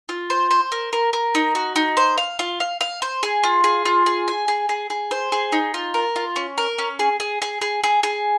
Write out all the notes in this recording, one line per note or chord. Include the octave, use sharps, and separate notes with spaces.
F4
C5
C5
A#4
A#4
A#4
D#4
F#4
D#4
C5
F5
F4
F5
F5
C5
G#4
F4
G#4
F4
G#4
G#5
G#4
G#4
G#4
C5
G#4
D#4
F4
A#4
F4
C#4
A#4
C#4
G#4
G#4
G#4
G#4
G#4
G#4